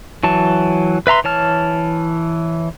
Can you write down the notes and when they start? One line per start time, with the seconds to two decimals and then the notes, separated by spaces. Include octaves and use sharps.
0.23 E3 F#3 A5
1.07 B4 E5 A#5 C6
1.24 E3 C#5 A5 F6